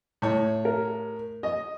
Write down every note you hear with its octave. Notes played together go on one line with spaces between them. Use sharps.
A2 C#5
A#4
D#5